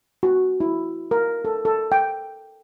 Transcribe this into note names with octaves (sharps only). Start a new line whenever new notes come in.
F#4
E4
A#4
A4
A4
G5